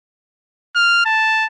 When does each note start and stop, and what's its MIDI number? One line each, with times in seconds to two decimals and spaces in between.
0.76 1.05 89
1.06 1.46 81